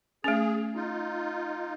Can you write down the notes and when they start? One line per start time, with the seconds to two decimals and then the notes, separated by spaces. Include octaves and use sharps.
0.24 A3 C#4 G#4
0.75 D#4 F4